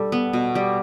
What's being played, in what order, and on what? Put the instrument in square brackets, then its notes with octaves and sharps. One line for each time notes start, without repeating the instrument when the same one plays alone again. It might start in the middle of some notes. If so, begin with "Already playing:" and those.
Already playing: [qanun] G3 [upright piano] A4
[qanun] B3
B2
G3